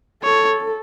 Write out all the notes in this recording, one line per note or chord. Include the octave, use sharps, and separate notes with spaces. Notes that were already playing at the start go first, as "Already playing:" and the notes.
A4 C#5